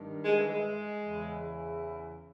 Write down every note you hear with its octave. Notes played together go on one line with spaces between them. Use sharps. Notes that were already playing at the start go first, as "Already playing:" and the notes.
Already playing: G2 D#3
G#3
E3
G#3
E2 C#3 E3